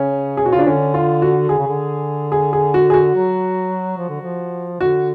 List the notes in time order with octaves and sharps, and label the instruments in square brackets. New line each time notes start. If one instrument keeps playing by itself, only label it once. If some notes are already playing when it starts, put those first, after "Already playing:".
Already playing: [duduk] C#3 [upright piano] C#4
[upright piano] G#4
[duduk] B2 [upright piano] F#4
[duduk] C#3 [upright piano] F4
[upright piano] D4
[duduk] D3 [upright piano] C#4
[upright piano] F4
F#4
[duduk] D3 [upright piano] G#4
[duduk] C#3
D3
[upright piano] G#4
G#4
F#4
G#4
F#4
[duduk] F#3
F3
D3
F3
[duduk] D3 [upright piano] F#4